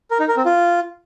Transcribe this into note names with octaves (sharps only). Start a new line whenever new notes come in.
A#4
D#4
A#4
C4
F4